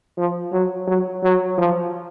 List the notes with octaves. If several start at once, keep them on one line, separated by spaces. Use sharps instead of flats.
F3
F#3
F#3
F#3
F3